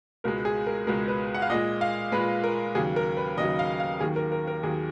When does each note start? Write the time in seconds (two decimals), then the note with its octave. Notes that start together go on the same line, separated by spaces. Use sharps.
0.24 C#2 B2 G#3 A#4
0.45 G#4
0.67 A#4
0.87 C#2 B2 G#3 A#4
1.08 B4
1.34 F#5
1.42 F5
1.50 A#2 G#3 D#5
1.81 F5
2.12 G#3 B4
2.17 A#2
2.44 A#4
2.75 D#2 C#3 F#3 G#4
2.96 A#4
3.17 B4
3.37 D#2 D#5
3.40 C#3 F#3
3.59 F5
3.80 F5
4.00 D#2 D#3 F#3 G#4
4.16 A#4
4.32 A#4
4.47 A#4
4.63 D#2 D#3 F#3 G#4